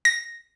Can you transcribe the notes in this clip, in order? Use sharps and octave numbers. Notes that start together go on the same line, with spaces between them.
A#6